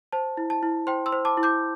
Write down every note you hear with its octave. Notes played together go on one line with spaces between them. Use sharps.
C5 A5
E4
A5
E4
C5 G5 C6
C6 E6
C5
A5 D6
E4
D6 G6